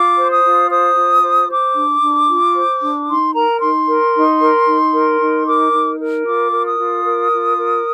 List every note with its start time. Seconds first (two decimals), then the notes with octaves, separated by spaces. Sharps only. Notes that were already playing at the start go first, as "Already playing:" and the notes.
Already playing: F4 D6
0.17 C5
0.30 D#6
0.43 F4
0.69 C5 D#6
0.96 F4
1.23 C5
1.49 C5 D6
1.75 D4
2.02 D4
2.29 F4
2.55 C5
2.81 D4
3.08 D#4 C6
3.34 A#4 A#5
3.61 D#4 C6
3.87 A#4
4.14 D#4
4.41 A#4
4.67 D#4
4.94 A#4
5.20 D#4
5.47 A#4 D6
5.73 D#4
5.99 A#4
6.26 F4 D6
6.52 A#4
6.65 D#6
6.79 F4
7.05 A#4
7.32 F4
7.58 A#4